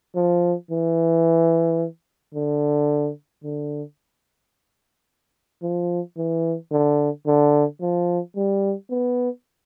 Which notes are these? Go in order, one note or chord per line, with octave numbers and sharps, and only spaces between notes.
F3
E3
D3
D3
F3
E3
D3
D3
F3
G3
B3